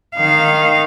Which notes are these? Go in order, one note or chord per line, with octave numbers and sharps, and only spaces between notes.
D#3 F5